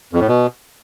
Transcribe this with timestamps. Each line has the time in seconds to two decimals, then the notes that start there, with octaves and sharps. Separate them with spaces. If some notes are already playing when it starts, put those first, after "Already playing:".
0.13 F2
0.20 A2
0.28 B2